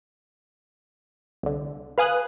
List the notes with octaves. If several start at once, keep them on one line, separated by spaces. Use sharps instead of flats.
C2 D3
B4 F5 G#5 D#6 F#6